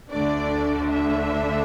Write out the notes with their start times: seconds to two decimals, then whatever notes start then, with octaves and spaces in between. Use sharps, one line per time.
0.11 D2 D3 A3 D4 D5
0.90 E5